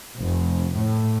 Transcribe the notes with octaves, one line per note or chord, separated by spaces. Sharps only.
F1
A2